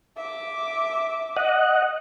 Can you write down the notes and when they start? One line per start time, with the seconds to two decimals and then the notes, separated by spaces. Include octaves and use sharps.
0.17 E5 D6
1.37 D#5 F#5